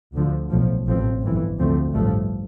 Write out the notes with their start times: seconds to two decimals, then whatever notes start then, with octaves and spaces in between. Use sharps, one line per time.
0.13 D2 D3 F3
0.50 B1 A2 F3
0.87 A1 A2 F3 C4
1.22 G1 F2 E3
1.59 D2 D3 F3 A3 C4
1.94 A1 G2 F3 A3